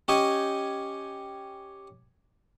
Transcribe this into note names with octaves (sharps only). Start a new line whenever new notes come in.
C#4 G4 C#5 D#5 G5 G#5